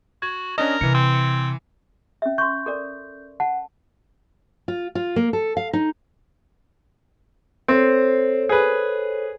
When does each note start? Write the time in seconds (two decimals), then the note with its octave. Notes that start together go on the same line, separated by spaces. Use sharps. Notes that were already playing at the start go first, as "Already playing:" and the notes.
0.22 F#4 G#6
0.58 C#4 D4 A#4 D#5
0.81 C3 E3 C#7
0.94 C4
2.22 C#4 E5
2.38 C6 C#6 G6
2.66 A4 A#4 D5
3.40 F#5 A5
4.68 F4
4.95 F4
5.16 A#3
5.33 A4
5.57 F5
5.73 D#4
7.68 C4 A4 C5 C#5
8.49 G#4 B4